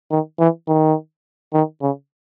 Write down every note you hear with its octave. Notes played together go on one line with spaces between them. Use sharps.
D#3
E3
D#3
D#3
C#3